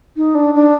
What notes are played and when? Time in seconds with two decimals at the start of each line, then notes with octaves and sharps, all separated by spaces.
0.17 D#4
0.35 D4
0.55 D4